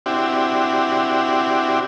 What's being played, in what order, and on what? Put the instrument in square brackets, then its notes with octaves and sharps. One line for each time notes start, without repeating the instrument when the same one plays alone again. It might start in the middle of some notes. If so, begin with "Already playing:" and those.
[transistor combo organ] C4 D4 E4 F#4 G4